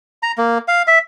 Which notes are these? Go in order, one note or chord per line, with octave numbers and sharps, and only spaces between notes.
A#5
A#3
F5
E5